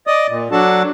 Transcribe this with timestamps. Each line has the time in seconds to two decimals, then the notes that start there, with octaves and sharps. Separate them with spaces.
0.07 D5 D#5 D#6
0.28 A#2
0.52 F#3 D4 F#4 A4 A5